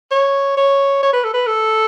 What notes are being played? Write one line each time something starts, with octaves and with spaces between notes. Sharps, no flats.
C#5
C#5
C#5
B4
A4
B4
A4